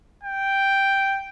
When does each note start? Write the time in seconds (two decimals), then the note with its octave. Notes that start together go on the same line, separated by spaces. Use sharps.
0.24 G5